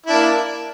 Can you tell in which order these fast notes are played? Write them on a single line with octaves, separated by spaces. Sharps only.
E4 D4 A#3